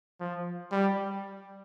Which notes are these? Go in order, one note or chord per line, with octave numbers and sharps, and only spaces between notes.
F3
G3